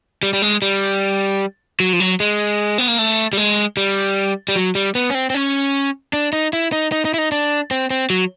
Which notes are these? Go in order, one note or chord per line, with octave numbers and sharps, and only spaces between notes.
G3
G3
G#3
G3
F#3
F3
F#3
G#3
B3
A#3
A3
G3
G#3
G3
G3
F#3
G3
B3
C#4
C4
C4
C#4
D4
D#4
E4
D#4
D#4
D#4
E4
D#4
D4
C4
C4
F#3